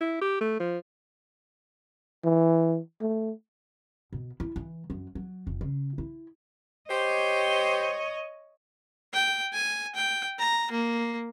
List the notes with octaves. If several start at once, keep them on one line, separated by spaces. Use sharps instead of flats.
E4
G4
A3
F3
E3
A3
B2
E4
E3
F#2
F#3
F1
C#3
E4
G4 C5 C#5 D#5
G5
G#5
G5
A#5
A#3